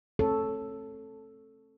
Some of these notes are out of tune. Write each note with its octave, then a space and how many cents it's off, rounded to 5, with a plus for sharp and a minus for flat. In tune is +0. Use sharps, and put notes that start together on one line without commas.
C4 +40 A4 +0 C#5 +0